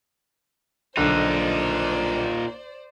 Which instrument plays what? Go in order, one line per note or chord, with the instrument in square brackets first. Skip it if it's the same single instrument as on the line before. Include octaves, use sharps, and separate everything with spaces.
[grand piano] B1 D3 [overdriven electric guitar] A#2 D#4 [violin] C5 D5